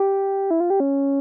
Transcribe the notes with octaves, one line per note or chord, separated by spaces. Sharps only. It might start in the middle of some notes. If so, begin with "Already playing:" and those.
Already playing: G4
E4
F4
G4
C#4